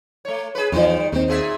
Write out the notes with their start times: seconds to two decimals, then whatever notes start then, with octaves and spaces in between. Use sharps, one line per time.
0.25 A3 C#5
0.55 G#4 B4
0.72 E2 D#3 F3 G3
1.12 D#2 D#3 C4
1.28 A#2 G#4 E5